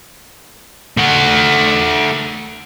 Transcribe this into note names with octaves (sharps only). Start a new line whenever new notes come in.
A3 F#5